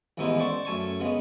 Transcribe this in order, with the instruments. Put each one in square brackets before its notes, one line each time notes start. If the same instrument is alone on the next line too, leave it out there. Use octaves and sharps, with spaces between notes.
[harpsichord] A1 D#2 G#3 B3 D#4 E4
C5 D5 A5 C#6
F#2 A3 G#5 A5 C#6
C#3 G#3 B3